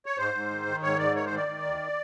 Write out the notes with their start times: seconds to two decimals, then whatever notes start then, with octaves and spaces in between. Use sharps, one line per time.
0.06 C#5
0.18 G#2 C5
0.34 G#2
0.50 D#3
0.66 D#3
0.83 G#2 C#5
0.99 G#2 D5
1.15 D#3 C#5
1.26 C5
1.32 D#3 D5
1.47 D#3
1.64 D2